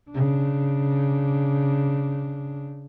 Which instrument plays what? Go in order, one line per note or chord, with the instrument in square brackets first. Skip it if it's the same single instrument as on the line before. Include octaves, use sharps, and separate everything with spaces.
[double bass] C#3 D4